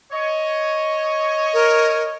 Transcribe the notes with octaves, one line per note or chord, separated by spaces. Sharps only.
C#5 D#5
A#4